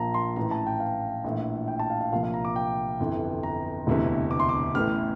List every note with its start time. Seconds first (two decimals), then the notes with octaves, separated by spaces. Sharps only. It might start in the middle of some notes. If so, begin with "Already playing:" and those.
Already playing: A#1 A#2 F3 F5 A5 A#5
0.14 C6
0.36 A1 A2 E3 A#5
0.51 A5
0.67 G5
0.80 F5
1.24 A#1 A2 E3
1.68 G5
1.79 A5
1.90 F5
2.01 F5
2.12 C2 A#2 F3 F5
2.23 F5
2.34 A#5
2.45 D6
2.56 G5
3.00 G1 F2 E3
3.43 A#5
3.87 E1 D2 C3 E3
4.31 D6
4.40 C6
4.49 D6
4.74 A1 A2 E3 F6